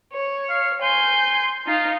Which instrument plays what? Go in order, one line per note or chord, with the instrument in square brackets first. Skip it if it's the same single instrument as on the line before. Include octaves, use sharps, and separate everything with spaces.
[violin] C#5
[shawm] F5
[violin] G#5 G6 [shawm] C6
[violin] D#4 F5 [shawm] F4